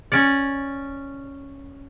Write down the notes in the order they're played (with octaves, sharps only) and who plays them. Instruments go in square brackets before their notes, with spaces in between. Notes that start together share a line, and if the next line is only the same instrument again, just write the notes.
[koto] C#4 D5